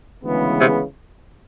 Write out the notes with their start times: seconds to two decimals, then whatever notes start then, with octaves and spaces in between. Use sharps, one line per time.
0.23 D2 C#3 E3 G#3 B3
0.61 C3